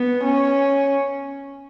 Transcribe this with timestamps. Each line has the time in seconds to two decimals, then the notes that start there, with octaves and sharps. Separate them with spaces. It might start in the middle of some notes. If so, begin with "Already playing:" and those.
Already playing: B3
0.24 C#4